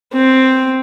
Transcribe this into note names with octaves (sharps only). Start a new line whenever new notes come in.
C4